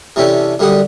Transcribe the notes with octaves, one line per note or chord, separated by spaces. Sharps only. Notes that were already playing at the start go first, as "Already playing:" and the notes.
C3 E3 C#4 D4 G4 A4
F#2 D3 G3 G4 F#5 D#6